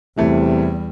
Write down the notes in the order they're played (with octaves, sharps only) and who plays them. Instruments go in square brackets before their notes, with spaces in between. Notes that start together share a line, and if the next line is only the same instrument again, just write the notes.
[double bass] E2 G3 [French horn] C3 [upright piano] E3 A3